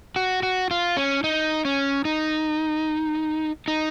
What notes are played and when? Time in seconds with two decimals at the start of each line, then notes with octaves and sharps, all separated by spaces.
0.16 F#4
0.43 F#4
0.71 F4
0.97 C#4
1.24 D#4
1.65 C#4
2.05 D#4
3.68 D#4